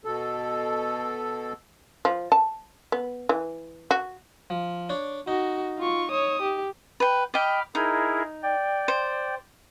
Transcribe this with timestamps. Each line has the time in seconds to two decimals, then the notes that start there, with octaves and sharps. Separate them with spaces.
0.05 B2 A4
2.05 F3
2.32 A5
2.92 B3
3.29 E3
3.91 F#4
4.50 F3
4.89 D4 C#5
5.28 D#4 F#4
5.78 F4 C#6
6.12 C#5 D#6
6.42 G4
7.00 B4 G5
7.34 D#5 G5 B5 D6 F6
7.75 D#4 E4 G#4 A#4
8.43 D5 G5
8.88 C5